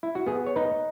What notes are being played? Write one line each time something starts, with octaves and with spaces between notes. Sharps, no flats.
E4
F#4
B3 G#4
C#5
D#4 B4